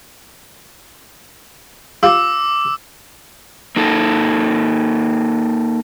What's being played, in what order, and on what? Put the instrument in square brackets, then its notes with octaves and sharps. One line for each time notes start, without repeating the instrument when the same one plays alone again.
[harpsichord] F4 G4 F5 [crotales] D6 E6
[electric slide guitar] A#3 D#4 A4